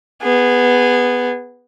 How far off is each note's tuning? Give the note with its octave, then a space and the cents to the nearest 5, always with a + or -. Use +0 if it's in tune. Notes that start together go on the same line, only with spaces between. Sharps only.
B3 +0 G#4 -15